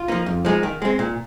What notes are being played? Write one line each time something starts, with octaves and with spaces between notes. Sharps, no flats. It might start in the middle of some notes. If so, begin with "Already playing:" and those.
Already playing: F4
F3 A#3 D#4
F2
F3 G#3 D#4
D#3
G#3 C4
A#2